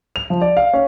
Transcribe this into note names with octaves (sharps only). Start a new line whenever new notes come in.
F7
F3
D5
F5
C#4